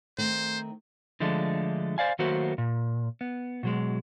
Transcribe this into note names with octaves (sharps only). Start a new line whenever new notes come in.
D#3 A3 C4 C5
D3 F3 G#3 A3 D4
C5 D5 F5 G#5
D#3 F#3 A3 A#3 F#4 C5
A#2
B3
B2 F#3 G#3